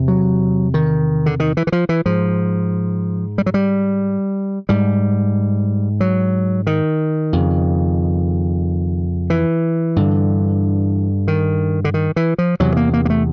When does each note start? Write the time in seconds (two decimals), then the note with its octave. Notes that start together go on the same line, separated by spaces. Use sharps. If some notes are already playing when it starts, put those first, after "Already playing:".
Already playing: E2 C3
0.08 F#3
0.74 D#3
1.26 D3
1.40 D#3
1.57 E3
1.67 E3
1.72 F3
1.89 E3
2.06 G#2 F3
3.38 G3
3.46 F#3
3.54 G3
4.69 G#2 G3
6.01 F#3
6.67 D#3
7.33 F2 C#3
9.30 E3
9.96 G2 D3
11.28 D#3
11.84 D3
11.94 D#3
12.16 E3
12.38 F3
12.60 E2 C3 F#3
12.77 A#3
12.94 A#3
13.05 A#3
13.10 A3